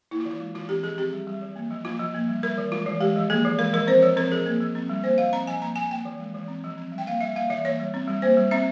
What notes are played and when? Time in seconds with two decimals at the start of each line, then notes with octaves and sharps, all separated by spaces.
0.11 A#3 E4
0.20 F4
0.25 E3
0.31 F4
0.40 G#3
0.55 E3 F4
0.69 C4 G4
0.83 F3 G#4
0.98 C4 G4
1.13 G3
1.27 G3
1.42 E3
1.56 A#3
1.71 F3
1.85 A#3 F4
1.99 F3
2.14 A#3
2.28 G3
2.43 G3 A#4
2.58 E3
2.72 G#3 F4
2.86 E3
3.01 G#3 G4
3.16 F3
3.30 A#3 G#4
3.45 E3
3.58 G#3 A#4
3.73 F3 A#4
3.87 C4 C5
4.02 F3 C#5
4.17 C4 A#4
4.32 F3 G#4
4.46 A#3
4.60 F3
4.75 C4
4.90 G3
5.04 A#3 C5
5.18 F3 F5
5.33 C4 A#5
5.47 F3 G#5
5.61 A#3 A#5
5.76 F3 G#5
5.91 A#3 G5
6.05 E3
6.20 G#3
6.34 E3
6.48 C4
6.64 F3
6.78 C4
6.92 G3
6.98 G5
7.07 A#3 F5
7.21 G3 E5
7.35 A#3 F5
7.50 E3 E5
7.65 A#3 C#5
7.80 G3
7.94 C4
8.08 G3
8.22 A#3 C5
8.37 G3
8.51 C4 E5